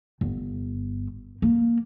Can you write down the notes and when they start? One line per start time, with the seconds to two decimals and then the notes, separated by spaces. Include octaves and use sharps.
0.21 G1
1.42 A#3